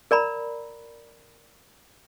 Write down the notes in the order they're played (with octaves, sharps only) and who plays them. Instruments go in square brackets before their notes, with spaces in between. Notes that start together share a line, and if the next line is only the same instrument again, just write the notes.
[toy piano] A#4 D5 A#5 B5